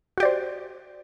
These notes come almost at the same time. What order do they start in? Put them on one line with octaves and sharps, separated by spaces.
F#4 G4 D5 C5